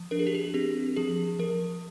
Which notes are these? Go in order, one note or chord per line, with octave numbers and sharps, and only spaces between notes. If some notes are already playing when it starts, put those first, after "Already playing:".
Already playing: F3
D4 A#4
G#4
G4
G#4
C4 G4
F3 G#4
F3 A#4